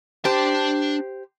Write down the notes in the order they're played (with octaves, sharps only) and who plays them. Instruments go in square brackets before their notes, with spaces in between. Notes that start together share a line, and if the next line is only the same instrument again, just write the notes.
[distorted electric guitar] D4 A5 [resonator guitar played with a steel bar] G4 C5